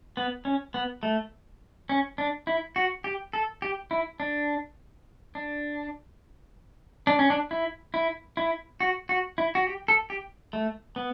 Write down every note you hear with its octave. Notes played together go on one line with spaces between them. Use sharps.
B3
C#4
B3
A3
C#4
D4
E4
F#4
G4
A4
G4
E4
D4
D4
D4
C#4
D4
E4
E4
E4
F#4
F#4
E4
F#4
G4
A4
G4
A3
B3